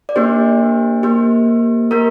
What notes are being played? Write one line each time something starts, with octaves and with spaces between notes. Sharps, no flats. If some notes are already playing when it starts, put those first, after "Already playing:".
D5
A#3 D4 G4 C5
A#3 G4
A#3 G4 A#4